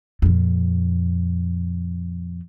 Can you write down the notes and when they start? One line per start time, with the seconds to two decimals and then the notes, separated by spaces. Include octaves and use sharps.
0.22 F2 A#2